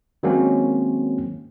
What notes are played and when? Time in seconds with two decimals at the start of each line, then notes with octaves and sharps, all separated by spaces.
0.23 D#3 F#3 G#3 A#3 C4 C#4